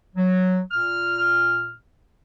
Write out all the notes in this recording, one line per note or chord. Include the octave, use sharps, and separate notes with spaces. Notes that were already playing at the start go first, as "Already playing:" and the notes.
F#3
A#2 F6